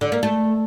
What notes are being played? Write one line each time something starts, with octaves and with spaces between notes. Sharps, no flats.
D3
A#3
A3